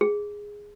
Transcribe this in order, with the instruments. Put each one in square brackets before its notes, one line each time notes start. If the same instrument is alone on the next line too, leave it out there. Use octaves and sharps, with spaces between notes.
[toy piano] G#4